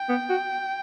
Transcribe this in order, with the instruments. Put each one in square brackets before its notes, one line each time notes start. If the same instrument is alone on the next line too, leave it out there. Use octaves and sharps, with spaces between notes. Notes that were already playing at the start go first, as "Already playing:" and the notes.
Already playing: [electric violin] G5
[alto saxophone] B3
F#4